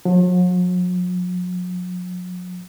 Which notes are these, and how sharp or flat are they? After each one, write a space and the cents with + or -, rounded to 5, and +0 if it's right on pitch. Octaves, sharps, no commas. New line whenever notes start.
F#3 -45